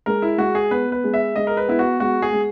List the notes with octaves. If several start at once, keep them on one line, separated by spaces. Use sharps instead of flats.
G#3 A#4
E4
G#3 F#4
G#4
B3 B4
B4
G#3
E5
G#3 D#5
A#4
B4
B3 E4
F#4
G#3 F#4
G#4
G#3